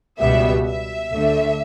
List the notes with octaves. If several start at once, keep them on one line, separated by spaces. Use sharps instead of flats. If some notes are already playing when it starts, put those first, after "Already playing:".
C#2 B2 G3 B3 E5
E5
D2 D3 A3